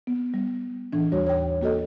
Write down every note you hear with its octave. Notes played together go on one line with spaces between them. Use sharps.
B3
G3
A2 E3 D4
D#2 G3 F#4 C#5
C#5 G5
A#3 F#4 A4 D#5